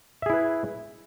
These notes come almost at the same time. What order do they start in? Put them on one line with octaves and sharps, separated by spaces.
E5 G#4 E4 B4